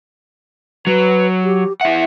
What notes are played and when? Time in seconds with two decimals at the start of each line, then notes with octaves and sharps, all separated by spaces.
0.87 F#3 B4
1.44 G4
1.81 E4 E5 F#5